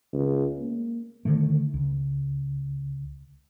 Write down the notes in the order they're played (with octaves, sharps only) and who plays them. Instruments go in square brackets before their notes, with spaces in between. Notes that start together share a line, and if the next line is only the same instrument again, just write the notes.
[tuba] C#2
A#3
[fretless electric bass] D3 D#3 A3
C#2